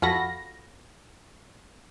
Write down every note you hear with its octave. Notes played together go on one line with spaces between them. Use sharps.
F2 F4 F#4 A4 B5 A#6